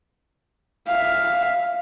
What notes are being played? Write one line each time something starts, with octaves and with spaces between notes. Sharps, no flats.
E5 F5